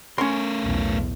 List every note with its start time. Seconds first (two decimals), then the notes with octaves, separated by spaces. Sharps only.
0.18 A3 C#4 A#4 C6
0.64 B1 E2 A2